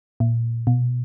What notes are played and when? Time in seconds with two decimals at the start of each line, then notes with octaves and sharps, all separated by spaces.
0.20 A#2
0.67 B2